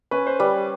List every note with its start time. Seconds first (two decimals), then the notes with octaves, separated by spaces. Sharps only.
0.11 C#4 B4
0.27 C5
0.40 G3 B4